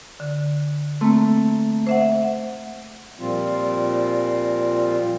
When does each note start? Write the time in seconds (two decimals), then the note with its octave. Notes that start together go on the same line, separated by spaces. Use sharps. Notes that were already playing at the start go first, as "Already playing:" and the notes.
0.20 D3
1.01 A3 A#3 C4
1.86 C5 E5 F#5
3.20 A#2 F3 G3 C4 F4